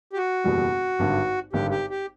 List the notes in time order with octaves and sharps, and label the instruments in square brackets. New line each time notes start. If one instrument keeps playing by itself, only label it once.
[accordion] G4
F#4
[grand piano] F#1 E2 B2 G3
G#1 G2 D3
[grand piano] G#1 G2 D3 [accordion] G4
[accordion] G4
G4